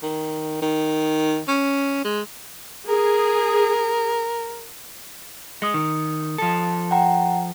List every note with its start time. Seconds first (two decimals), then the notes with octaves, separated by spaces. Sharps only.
0.03 D#3
0.62 D#3
1.48 C#4
2.04 G#3
2.88 G#4 A#4
5.62 G#3 D#6 C#7
5.74 D#3
6.38 F3 A4
6.91 F#5 G5 A#5